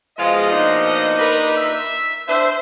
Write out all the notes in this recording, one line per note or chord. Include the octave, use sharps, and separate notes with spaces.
B2 F3 G#3 F4 D#5
A#2 D4 D#4
G4 A#4 B4
E5
D4 C5 E5